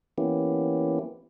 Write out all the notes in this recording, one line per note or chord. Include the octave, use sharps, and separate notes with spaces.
E3 A#3 B3 C#4 E4 G4